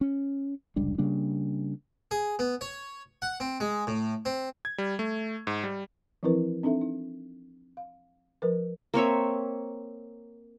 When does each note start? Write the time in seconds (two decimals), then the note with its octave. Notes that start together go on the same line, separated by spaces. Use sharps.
0.01 C#4
0.76 F1 C#2 G3 D4
0.98 C#3 G3 A#3 D4
2.11 G#4
2.39 B3
2.61 C#5
3.22 F#5
3.40 C4
3.60 G#3
3.87 A2
4.25 C4
4.65 G#6
4.78 G3
4.99 A3
5.47 G#2
5.64 G3
6.23 E3 F3 C4 E4 A#4 B4
6.63 C4 D4 D#4 A4 E5
6.81 D#4
7.77 F5
8.42 F3 A#4 B4
8.94 A#3 C4 C#5 E5